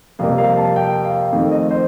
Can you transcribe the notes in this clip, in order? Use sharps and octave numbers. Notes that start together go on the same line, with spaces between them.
F2 C3 G3 A#3 F5
F5
A5
G5
F5
F2 D#3 A3 C4
D#5
C5